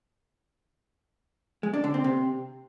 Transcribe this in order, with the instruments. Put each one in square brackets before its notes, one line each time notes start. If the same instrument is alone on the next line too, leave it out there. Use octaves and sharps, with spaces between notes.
[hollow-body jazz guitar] G#3
D4
D3
C4
C3